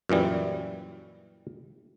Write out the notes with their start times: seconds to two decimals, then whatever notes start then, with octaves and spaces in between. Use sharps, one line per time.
0.09 F#2 A#2 E3 G3